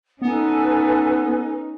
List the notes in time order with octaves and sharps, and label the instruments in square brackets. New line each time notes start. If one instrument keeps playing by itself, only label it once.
[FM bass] B3 [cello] C#4 D#4 [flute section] A4 B4 G#5